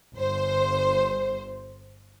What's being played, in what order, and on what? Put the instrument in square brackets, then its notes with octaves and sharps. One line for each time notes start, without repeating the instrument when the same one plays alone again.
[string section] G1 C5